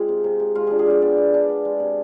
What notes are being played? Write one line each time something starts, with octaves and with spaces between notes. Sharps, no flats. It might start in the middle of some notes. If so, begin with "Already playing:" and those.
Already playing: G#3 C4 F4 G#4 G#5
C3
C3
C3
G#3 F4
D4 G#4
G#4
D4 D5
B3 D5
B3
D4
B3
G#3
C3